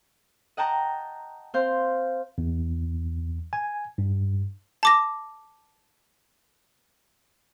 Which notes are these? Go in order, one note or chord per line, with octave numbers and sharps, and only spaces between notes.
D#5 F#5 G5 A5 A#5
C4 C5 F5 G6
E2
G#5
G2
A5 D6 A#6